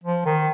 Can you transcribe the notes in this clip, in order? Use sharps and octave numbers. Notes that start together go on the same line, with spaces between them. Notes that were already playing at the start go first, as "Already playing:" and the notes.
F3
D#3